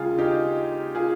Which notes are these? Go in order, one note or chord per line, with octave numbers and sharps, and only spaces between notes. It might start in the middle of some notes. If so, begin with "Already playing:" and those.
Already playing: D#2 C#3 G#3 F4 G#4
D#4 G4
F4 G#4